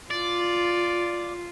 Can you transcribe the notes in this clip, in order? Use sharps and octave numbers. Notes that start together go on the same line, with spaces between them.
F4 D5